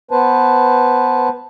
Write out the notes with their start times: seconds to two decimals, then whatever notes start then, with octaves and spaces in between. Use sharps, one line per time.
0.11 B3 B4 C5 A5